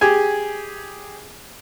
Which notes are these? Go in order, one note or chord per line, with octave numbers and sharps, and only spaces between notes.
G4 G#4 G#5